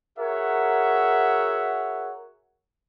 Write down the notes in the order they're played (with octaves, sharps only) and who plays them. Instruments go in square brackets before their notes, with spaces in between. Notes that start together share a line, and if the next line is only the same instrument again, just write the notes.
[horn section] F#4 G#4 A#4 C#5 E5 F#5